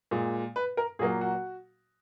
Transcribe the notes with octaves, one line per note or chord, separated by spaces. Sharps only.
A#2 G#3
B4
A#4
A#2 F#3 A#3 G#4
F#4